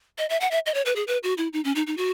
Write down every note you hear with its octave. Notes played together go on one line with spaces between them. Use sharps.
D#5
E5
F#5
E5
D#5
C#5
B4
G#4
B4
F#4
E4
D#4
C#4
D#4
D#4
F#4